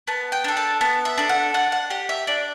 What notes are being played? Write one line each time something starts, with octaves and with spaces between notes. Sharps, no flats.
B3 A5
G5
D4 A4
A5
B3 A5
E5
D4 A4
F#5
D4 F#5
F#5
G4 F#5
E5
D4 D5